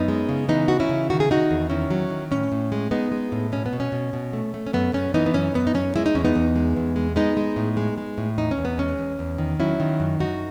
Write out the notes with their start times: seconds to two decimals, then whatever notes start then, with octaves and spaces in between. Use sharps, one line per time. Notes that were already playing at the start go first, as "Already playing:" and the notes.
Already playing: F#2 B3 D#4
0.08 G#3
0.29 C#3
0.48 E3 B3 D#4
0.68 E3 F#4
0.80 C#4 E4
0.89 C#3
1.10 D#3 F#4
1.20 G#4
1.29 D#3 D#4 F#4
1.51 E2
1.70 D#3 C#4 E4
1.91 F#3
2.10 D#3
2.31 A2 C#4
2.52 A2
2.72 G#3
2.91 G#3 B3 D#4
3.12 G#3
3.32 A2
3.52 B2 C#4
3.66 B3
3.73 B2
3.80 C#4
3.92 B2
4.13 B2
4.33 A3
4.54 A3
4.67 C#4
4.73 F#2 B3
4.93 F#2 C#4
5.14 E3 B3 D#4
5.26 B3
5.34 F#2 C#4
5.54 F#2 B3
5.67 D#4
5.74 F#2 C#4
5.96 G#3 E4
6.06 D#4
6.15 E2 C#4
6.25 B3 D#4
6.35 E2
6.56 G#3
6.76 E2
6.96 G#3
7.16 G#3 B3 D#4
7.37 G#3
7.56 A2
7.77 G#3
7.98 G#3
8.18 A2
8.38 E2 D#4
8.51 C#4
8.58 E2
8.65 B3
8.78 G#3 C#4
8.99 E2
9.19 E2
9.38 D#3
9.60 F#3 C#4 E4
9.80 D#3
10.00 F#2
10.19 F#2 D#4 F#4